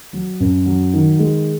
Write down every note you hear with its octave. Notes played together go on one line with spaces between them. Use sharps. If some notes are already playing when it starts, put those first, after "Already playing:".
F#3
F#2
F#3
D#3
G#3